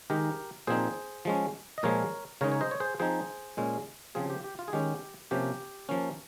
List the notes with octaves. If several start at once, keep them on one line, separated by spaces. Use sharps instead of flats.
D#3 G#3 D#4 G4 A#4
A#2 F3 C4 D#4 G#4 C5
F3 G#3 C#4
D#5
A#2 F3 G#3 A#4 C#5
C#3 G#3 D#4 A#4 C#5
C#5
C5 D#5
C#5
G#4 C5
F3 C4 D#4 G#4 C5
A#2 G#3 C#4
C#3 F3 C4 F4 G#4
G4
G4
F4
G#4
D#3 G#3 C#4 G4
C3 F3 A#3 C#4 G4
F3 A#3 C#4